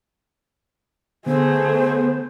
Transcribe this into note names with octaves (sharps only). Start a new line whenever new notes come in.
D3 A3 B3 G#4 C5